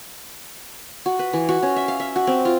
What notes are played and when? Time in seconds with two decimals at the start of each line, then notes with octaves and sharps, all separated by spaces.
1.06 F#4
1.19 B4
1.33 E3
1.49 F#4
1.62 C#4
1.76 E5
1.88 F5
2.00 E5
2.16 F#4
2.27 C4
2.45 F4